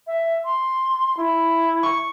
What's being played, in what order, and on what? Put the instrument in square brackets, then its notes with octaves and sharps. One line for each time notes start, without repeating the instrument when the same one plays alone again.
[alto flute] E5
C6
E4
[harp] C#6